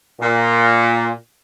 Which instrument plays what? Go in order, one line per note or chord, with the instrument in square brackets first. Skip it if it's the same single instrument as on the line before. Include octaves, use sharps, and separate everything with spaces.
[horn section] A#2